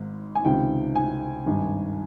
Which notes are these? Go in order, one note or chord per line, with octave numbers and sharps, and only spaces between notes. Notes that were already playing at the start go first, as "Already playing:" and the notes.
Already playing: G#1 G#2
G#5
C#2 C3 D#3 G5
G#5
G#1 G2 D#3